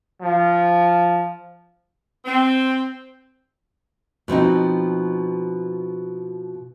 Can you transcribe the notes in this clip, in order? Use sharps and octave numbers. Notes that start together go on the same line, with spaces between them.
F3
C4
B2 F3 C4 D#4